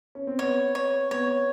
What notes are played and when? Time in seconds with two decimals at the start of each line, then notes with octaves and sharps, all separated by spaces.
0.15 C#4
0.27 C4
0.39 B3 C#5
0.75 C#5
1.11 B3 C#5